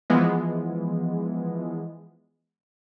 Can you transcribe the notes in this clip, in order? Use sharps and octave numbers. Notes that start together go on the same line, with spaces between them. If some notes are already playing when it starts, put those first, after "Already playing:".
E3 F3 G#3 B3